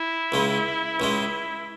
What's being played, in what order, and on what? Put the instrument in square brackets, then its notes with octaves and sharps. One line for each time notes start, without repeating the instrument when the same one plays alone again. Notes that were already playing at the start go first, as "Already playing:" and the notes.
Already playing: [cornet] E4
[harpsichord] C#2 C#3 G#3
C#2 C#3 G#3